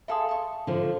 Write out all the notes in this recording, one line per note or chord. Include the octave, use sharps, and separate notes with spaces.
G#4 A4 E5 F5 C6 D#6
A5 C#6
D3 F3